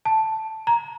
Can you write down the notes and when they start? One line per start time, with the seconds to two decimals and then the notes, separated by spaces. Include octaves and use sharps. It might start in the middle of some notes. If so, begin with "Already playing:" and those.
0.05 A5
0.67 A#5